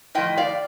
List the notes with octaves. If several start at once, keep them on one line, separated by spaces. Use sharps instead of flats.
A2 F3 D#5 G5
D5 F5